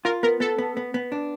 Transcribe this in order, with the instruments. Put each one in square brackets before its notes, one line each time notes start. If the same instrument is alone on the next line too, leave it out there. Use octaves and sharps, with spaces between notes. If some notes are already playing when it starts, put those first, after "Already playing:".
[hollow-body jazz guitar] F4 [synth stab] A#4
[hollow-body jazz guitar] B3 [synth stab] A#4
[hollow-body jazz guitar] B3 [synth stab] A4
[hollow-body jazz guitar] B3
B3
B3
D4